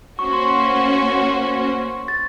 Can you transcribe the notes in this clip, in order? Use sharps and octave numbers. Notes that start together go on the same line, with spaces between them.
A#3 C#4 F#4 C5 C#6
C6
C#6
A6